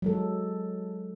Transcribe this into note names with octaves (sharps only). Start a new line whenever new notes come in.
F#3 G#3 A4